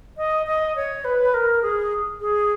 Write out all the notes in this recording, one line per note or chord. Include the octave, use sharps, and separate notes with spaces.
D#5
D#5
C#5
B4
A#4
G#4
G#4